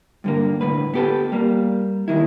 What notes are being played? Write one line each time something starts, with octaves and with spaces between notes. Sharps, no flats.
G2 D3 A#3
A2 D3 B4
B3 G4 A4
G3 A#3
D#2 A2 D#3 E4